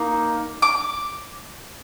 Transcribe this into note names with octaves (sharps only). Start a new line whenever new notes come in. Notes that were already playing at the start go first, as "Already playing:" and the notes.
Already playing: A#3 D#4
D6